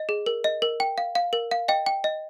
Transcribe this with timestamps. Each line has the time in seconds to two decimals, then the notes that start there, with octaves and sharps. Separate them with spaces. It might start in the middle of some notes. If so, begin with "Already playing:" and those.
Already playing: D#5
0.09 G#4
0.26 A#4
0.44 D#5
0.62 A#4
0.80 G5
0.98 F5
1.15 F5
1.33 A#4
1.51 F5
1.68 D#5 G5
1.86 G5
2.04 D#5